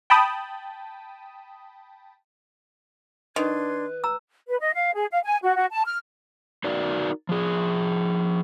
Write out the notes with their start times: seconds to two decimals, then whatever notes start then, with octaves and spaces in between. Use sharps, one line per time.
0.10 G5 A5 B5 D#6
3.36 D#3 D4 B4 C6 G#6
4.04 A#5 E6
4.48 B4
4.60 D#5
4.75 F5
4.94 G#4
5.11 F5
5.24 G#5
5.43 F#4
5.55 F#4
5.70 A5
5.85 F6
6.64 D#4 F#4 A#4 D5
7.29 F3 G#4